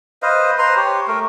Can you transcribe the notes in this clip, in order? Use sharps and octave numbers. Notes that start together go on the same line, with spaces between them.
B4 C5 D#5 F5
B4 C5 A#5 C6
G4 C#5
A3 A#4